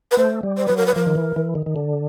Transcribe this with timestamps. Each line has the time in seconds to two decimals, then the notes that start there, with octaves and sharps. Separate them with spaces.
0.11 B4
0.17 A3 C5
0.43 G3
0.57 C5
0.66 F#3 B4
0.77 A#4
0.86 B4
0.96 F3 A#4
1.06 D#3
1.15 E3
1.36 E3
1.55 D#3
1.66 D#3
1.76 D3